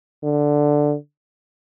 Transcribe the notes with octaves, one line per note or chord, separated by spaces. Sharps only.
D3